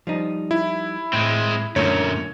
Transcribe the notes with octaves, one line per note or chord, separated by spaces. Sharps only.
F3 G3 D#4
E4
A2 G#3 C4
F#2 A#2 D3 A3 A#3 C#5